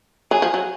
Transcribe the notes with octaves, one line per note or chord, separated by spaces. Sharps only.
F#3 G#4
F3
F#3